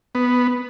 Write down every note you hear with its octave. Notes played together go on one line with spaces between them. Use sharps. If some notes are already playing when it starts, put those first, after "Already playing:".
B3